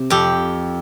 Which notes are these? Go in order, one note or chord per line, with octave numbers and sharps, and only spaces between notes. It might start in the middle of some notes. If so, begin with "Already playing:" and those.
Already playing: C3
F2 G4